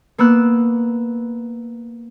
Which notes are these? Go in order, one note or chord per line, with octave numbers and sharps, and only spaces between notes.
A#3 B3 E6 F#6